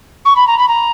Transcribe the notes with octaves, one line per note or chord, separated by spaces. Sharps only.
C#6
B5
A#5
B5
A#5